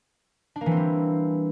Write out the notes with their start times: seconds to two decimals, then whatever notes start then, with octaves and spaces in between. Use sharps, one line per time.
0.56 D4
0.61 A#3
0.66 E3
0.71 C4
0.77 G3